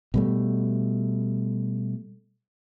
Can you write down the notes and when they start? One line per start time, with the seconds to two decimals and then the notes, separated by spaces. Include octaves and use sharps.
0.14 B2 G3 A3